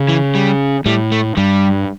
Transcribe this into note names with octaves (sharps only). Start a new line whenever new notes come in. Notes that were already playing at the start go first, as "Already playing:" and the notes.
Already playing: C#3
E3
G3
A2 G3
A3
G2 G3